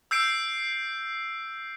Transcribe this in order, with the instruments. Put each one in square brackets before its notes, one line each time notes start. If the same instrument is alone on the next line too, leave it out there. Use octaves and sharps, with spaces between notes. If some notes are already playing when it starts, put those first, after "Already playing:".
[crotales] E6 G6 C7 D7